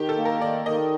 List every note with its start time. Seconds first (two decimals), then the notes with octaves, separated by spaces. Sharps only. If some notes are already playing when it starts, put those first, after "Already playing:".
Already playing: D#3 G4
0.09 A4
0.17 A#3
0.25 A#4
0.41 D#3 D5
0.66 D#3 D#5